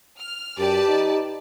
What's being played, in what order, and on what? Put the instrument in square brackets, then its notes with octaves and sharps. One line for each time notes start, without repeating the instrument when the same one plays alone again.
[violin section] F6
[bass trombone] F#2 [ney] G4 [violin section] B4 D5 A5
[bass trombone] D#4